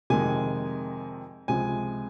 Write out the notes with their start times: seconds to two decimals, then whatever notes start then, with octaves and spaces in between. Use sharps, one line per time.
0.10 F2 C3 D#3 G#3 G#5
1.48 C#2 C3 F3 G#3 G#5